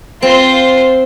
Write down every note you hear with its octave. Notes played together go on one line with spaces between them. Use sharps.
C4 F4 C5